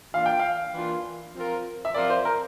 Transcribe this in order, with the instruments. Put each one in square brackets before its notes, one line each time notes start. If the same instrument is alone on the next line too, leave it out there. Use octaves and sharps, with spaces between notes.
[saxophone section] E3 A#3 D4 F4 [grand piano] F5
[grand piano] G5
F5
[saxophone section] E3 A#3 D4 F4
F3 C4 F4 A#4
[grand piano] E5
[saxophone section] F3 C4 F4 A#4 [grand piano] D5
[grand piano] C5
A#4